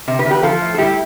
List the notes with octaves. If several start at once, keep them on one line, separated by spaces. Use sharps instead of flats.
C3
G4 B4
E2
G4 B4
F3 F4 A4
A2
A4
G3 E4 G4